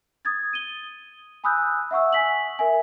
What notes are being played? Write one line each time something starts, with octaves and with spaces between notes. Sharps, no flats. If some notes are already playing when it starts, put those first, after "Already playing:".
D#6 G#6 A6
D#7 G7
G#5 B5 D#6 E6 F#6 G6
E5 F#5 C#6 E6
G#5 B6 F#7
A#4 E5 G#5